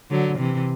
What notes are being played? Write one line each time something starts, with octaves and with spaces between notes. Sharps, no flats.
D3 F#3
C3 E3